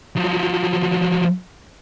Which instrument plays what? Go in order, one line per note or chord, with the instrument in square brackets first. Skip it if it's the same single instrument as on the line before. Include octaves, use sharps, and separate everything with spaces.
[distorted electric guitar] F3 F#3